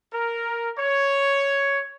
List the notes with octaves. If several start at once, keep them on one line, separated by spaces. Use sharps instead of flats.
A#4
C#5